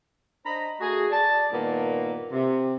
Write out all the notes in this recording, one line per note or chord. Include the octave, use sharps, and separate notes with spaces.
D4 C5 D#5 A#5 B5
A3 F#4 G#4
D5 A5
G2 A#2 D#3 A#3 B3
C3